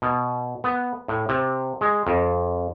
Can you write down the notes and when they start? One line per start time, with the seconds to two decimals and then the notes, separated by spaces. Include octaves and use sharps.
0.02 B2
0.64 B3
1.08 A2
1.29 C3
1.81 G#3
2.07 F2